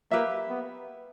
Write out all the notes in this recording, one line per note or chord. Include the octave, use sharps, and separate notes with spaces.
A#3 G4 B4 E5
B3